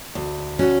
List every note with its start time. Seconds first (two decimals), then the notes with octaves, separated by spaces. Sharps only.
0.15 D2
0.59 C#4 F#4